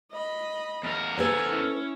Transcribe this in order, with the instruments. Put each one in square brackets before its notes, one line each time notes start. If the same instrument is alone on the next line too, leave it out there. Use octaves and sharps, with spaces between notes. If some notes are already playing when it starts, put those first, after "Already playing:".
[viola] D#5 B5
[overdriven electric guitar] E2 A#4
[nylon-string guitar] A4 B4 C5 [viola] G#5
[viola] C#4 E4